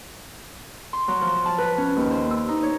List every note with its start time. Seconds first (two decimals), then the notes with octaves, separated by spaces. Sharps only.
0.93 C6
1.08 F#3
1.21 F3
1.46 A5
1.58 B4
1.78 C#4
1.97 D#2
2.11 C5
2.31 E6
2.49 D#4
2.63 C#5